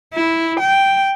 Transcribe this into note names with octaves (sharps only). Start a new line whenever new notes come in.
E4
G5